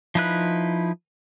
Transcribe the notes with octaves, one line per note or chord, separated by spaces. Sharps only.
F3 D#4 E4 B4 F#6